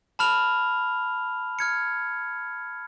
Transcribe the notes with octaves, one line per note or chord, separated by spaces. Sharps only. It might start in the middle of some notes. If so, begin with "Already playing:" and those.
A5 B5 F6 F7
F6 G#6 C#7